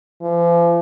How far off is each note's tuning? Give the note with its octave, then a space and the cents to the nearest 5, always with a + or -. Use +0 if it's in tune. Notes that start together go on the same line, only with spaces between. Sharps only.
F3 -40